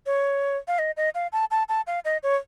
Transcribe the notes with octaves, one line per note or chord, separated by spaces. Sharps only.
C#5
F5
D#5
D#5
F5
A5
A5
A5
F5
D#5
C#5